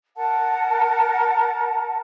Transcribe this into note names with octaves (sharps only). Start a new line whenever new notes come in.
A#4 F#5 A5